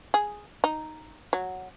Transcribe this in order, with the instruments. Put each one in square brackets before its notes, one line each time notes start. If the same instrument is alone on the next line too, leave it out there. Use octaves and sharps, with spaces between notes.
[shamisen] G#4
D#4
F#3